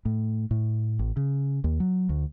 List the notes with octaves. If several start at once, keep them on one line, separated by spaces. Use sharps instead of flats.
A2
A2
A1
C#3
D#2
F#3
D2